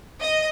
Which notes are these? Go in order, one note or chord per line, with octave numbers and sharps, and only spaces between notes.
D#5